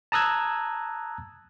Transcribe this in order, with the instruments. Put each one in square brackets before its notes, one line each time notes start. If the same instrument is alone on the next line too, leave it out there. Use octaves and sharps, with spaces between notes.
[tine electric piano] A5 A#5 D#6 E6 F#6 G#6